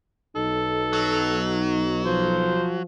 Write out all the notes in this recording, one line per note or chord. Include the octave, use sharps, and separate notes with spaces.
B1 D#4 A4
F#3
F3 C5